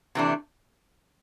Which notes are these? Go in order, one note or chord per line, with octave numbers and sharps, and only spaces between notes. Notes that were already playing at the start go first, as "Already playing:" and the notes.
C3 E3 A3 D4